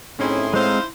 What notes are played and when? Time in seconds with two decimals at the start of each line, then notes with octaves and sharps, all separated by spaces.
0.19 A2 C4 C#4 D#4 E4 G#4 C6
0.54 G#3 C4 D#4 E4 C5 F5